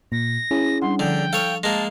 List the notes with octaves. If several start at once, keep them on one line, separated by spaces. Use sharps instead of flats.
A#2 A#6
C#4 E4 G#4
G3 D4 F#5 C6
D3 F3 G5
A4 C#5 F5
G#3 A#3 A5 A#6